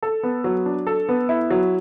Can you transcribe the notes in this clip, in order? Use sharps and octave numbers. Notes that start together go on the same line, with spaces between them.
A4
B3
F#3
D4
A4
B3
E4
F#3